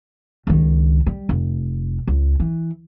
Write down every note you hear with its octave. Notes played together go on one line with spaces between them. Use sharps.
C#2 D#3
G3
F1
C#2
E3